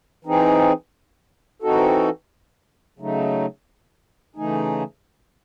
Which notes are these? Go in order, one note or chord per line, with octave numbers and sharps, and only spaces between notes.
E3 C4 D#4 G#4
E3 C4 D#4 F#4 A4
C#3 F#3 A3 D#4
C#3 E3 A3 D#4 G#4